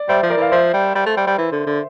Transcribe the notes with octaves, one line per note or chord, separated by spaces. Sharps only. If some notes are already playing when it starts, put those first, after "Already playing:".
Already playing: D5
G3 C5 E5
F3
A#4 D5
E3 F5
F3 C5 E5
G3
G3
A3
G3
G3
E3
D3
D3